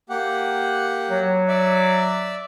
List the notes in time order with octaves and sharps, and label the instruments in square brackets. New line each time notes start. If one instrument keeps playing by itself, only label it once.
[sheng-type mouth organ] A#3 G4 F#5
[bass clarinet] F#3
[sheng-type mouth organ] D5 E5